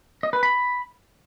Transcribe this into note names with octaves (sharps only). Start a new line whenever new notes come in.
D#5
B4
B5